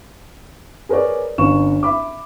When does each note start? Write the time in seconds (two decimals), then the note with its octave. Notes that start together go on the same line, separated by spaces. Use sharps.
0.89 G#4 A#4 B4 C#5 D5
1.38 G1 C#4 C#6 E7
1.83 E5 B5 D6